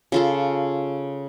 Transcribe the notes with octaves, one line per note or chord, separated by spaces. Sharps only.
C#3 F4 A4